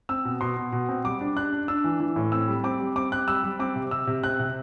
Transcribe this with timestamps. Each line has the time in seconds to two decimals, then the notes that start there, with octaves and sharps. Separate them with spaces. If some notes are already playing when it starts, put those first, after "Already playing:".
0.09 C4 E6
0.25 B2
0.41 B2 C6
0.56 B2
0.72 B2
0.89 C4
1.05 G3 D6
1.21 D4
1.36 D4 F#6
1.53 D4
1.68 D4 E6
1.84 E3
2.00 E3
2.16 A2
2.32 C4 E6
2.48 G3
2.64 C4 D6
2.80 G3
2.96 C4 D6
3.12 C4 F#6
3.27 G3 E6
3.43 G3
3.59 C4 D6
3.75 C3
3.91 C3 E6
4.07 C3
4.23 C4 F#6
4.39 C3